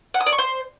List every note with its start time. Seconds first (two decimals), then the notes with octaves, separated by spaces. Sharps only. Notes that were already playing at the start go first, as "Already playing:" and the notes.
0.14 F#5
0.20 D#6
0.26 D5
0.32 C#6
0.38 C5